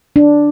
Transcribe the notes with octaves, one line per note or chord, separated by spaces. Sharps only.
D4